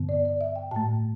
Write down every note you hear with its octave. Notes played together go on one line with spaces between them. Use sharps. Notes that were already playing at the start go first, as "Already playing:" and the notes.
Already playing: G2 D3 B3
D5
D5
E5
G5
A2 A3 A5